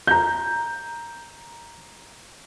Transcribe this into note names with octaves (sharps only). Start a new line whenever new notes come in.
A#5 G6